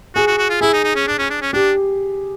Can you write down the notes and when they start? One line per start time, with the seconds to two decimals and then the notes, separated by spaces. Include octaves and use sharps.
0.15 F#4 G#4
0.27 F#4
0.38 F#4
0.50 F4
0.61 E4 G#4
0.73 D#4
0.84 D#4
0.96 C#4
1.07 D4
1.19 C#4
1.30 D4
1.42 C#4
1.53 D4 G4